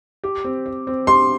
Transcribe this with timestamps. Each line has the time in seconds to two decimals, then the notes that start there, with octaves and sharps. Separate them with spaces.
0.24 G4
0.44 C4
0.66 C5
0.87 C4
1.07 G4 C6